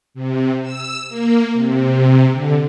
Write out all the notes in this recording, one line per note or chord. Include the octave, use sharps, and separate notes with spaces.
C3
E6
A#3
C3
D3